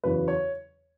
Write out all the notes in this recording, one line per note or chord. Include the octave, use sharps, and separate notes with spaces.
E2 C#3 F#3 B4
C#5